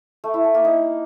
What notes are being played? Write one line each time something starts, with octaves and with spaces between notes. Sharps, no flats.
A3
E4
A4
A#3
D#4